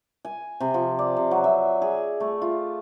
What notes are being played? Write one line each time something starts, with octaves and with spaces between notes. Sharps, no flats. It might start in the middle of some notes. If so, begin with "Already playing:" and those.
G#5
C3
F3
D5
C3
F#3
E5
G#4
A3
F4